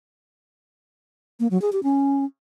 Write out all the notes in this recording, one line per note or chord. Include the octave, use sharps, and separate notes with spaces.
A#3
F#3
G#4
G4
C#4